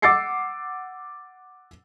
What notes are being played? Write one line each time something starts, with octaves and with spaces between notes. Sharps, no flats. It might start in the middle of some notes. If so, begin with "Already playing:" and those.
F#5 D6 E6 A6 C7 C#7